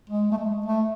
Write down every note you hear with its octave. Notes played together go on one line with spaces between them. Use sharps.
G#3
A3
G#3
A3